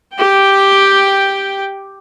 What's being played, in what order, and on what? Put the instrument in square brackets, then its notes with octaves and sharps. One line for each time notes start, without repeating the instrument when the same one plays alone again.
[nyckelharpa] G4 G5